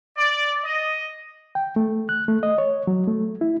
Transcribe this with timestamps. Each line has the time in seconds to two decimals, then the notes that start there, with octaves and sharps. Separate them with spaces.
0.17 D5
0.64 D#5
1.55 G5
1.76 A3
2.09 F#6
2.28 A3
2.43 D#5
2.58 C#5
2.87 F#3
3.07 A3
3.41 E4